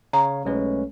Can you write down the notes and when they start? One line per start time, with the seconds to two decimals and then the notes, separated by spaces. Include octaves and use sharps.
0.13 C#3 C#5 F5 A#5
0.45 B1 G#3 A3 C#4 B4